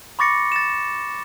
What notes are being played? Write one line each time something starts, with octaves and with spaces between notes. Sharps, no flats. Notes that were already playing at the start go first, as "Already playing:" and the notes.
B5 C#6 D6 A6 A#6 C#7
A6 E7